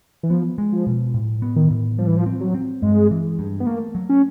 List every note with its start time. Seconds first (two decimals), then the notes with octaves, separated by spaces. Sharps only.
0.23 E3
0.30 F3 B3
0.58 G#3
0.73 F3
0.87 B2
1.14 A2
1.42 B3
1.56 D#3
1.71 A2
1.98 F3 G3
2.07 E3
2.17 F3
2.26 C4
2.41 F#3
2.54 C4
2.82 G2 G#3
3.11 E3
3.39 G2
3.60 B3
3.66 A3 A#3
3.95 F#3
4.09 C#4